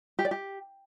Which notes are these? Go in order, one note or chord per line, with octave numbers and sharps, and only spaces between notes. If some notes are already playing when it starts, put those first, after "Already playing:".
G4
D5
G4